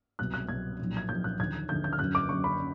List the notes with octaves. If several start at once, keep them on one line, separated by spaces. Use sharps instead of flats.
C2 B2 F#3 F#6
F#6
C2 B2 F#3 G#6
B1 A#2 F3
G#6
B1 A#2 F3 G6
F#6
D#2 D3 F3 G#6
D#2 D3 F3 G6
G6
F6
F#1 F#2 D3 F#6
D6
F#1 F#2 D3 C#6
B5